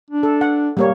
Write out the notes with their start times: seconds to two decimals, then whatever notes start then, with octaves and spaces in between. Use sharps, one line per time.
0.10 D4
0.23 A4
0.41 F#5
0.77 G3 A#3 C#5